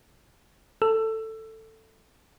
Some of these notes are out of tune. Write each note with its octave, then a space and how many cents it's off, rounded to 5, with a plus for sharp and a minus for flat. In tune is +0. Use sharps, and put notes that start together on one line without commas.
A4 +10 E6 +20